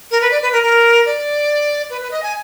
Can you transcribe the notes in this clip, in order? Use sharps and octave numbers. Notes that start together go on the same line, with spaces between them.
A#4
B4
D5
B4
A#4
A#4
D5
B4
B4
D#5
G#5